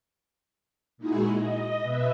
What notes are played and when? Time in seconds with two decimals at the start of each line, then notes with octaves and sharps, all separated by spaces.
0.98 A#2 G#3 D#4 E4 F#4 G#4
1.37 D#5
1.82 B2 B4 E5